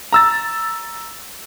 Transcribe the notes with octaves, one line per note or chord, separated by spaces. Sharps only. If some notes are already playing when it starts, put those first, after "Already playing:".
A#5 E6 A6